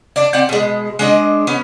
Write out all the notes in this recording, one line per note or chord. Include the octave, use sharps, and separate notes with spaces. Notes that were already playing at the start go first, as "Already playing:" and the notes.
D4 D5
C4 D5 F#5
B2 G#3
G#3 D4 D#5
B3 C#4